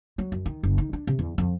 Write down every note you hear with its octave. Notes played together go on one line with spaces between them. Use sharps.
F#3
F#2
D#3
F#1
D#3
D4
C3
E2
F2